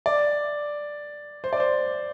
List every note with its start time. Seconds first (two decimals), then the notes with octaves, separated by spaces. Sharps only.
0.06 D5
1.44 C5
1.53 D5
1.60 C5